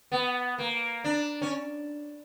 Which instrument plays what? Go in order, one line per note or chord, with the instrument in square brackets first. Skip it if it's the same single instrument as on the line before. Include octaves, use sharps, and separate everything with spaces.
[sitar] B3
A#3
D4
C#4